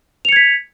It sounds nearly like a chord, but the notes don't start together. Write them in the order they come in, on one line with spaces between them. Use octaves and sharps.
F7 C#7 G#6 B6